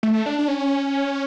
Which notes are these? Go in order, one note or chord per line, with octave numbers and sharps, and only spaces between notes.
A3
D4
D4
C#4